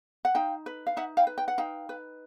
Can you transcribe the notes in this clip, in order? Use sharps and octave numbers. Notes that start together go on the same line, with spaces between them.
F#5
D#4 F5 G5
B4
F5
D#4 E5 F#5
F5 G5
B4
G5
F#5
D#4 F5 G5
B4